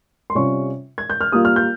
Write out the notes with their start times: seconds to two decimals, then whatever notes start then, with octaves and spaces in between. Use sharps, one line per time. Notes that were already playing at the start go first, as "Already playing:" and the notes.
0.30 C6
0.35 C3 G3 C#4 F4 C#6
0.98 G#6
1.10 G6
1.21 F6
1.32 G3 A#3 F4 D#6
1.45 F6
1.56 G6